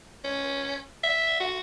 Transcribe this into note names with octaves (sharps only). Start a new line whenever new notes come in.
C#4
E5
F#4